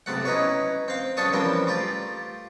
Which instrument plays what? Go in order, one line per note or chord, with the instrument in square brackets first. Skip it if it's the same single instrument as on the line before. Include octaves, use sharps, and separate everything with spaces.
[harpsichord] B1 C3 A3 F#5
C#4 D#4 E4 B4 C#5
C4 F5
B1 C#4 D4 A4 C#6 D#6
E3 F3 G3 C4 C#4 A#4
A3 F4 G4